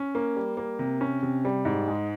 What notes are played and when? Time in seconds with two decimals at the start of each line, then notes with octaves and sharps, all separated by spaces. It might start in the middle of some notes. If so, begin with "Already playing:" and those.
Already playing: C#4
0.15 A#3
0.36 G3
0.57 A#3
0.79 C3
1.01 C#4
1.23 C3
1.45 G3
1.65 G#2
1.88 G#3